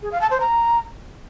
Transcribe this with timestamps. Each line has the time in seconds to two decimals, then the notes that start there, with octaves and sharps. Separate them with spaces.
0.02 G#4
0.12 F5
0.21 A5
0.31 C5
0.40 A#5